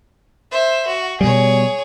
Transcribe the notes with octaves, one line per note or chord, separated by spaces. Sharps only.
C5 E5
F#4
B2 G3 G#4 C#5